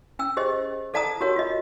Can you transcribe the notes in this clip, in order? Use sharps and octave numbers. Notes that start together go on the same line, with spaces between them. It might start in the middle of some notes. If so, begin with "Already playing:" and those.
C#4 G5 E6
G4 G#4 C5 D#5
A4 D5 F#5 A5 A#5 D#6
F#4 G4 A#4 C#5 F#5
F4 D#5